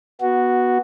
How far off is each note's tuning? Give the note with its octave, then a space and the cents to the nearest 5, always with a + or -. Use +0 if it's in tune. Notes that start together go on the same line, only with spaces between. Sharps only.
B3 -15 F#4 +0